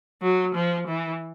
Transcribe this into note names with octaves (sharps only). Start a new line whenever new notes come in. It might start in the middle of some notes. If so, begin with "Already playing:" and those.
F#3
F3
E3